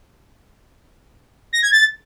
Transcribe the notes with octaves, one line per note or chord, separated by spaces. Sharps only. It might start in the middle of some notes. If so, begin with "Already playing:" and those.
A#6
G#6
A6